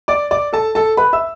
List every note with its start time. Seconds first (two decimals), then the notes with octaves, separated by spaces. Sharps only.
0.08 D5 D6
0.31 D5 D6
0.53 A4 A5
0.75 A4 A5
0.97 B4 B5
1.13 E5 E6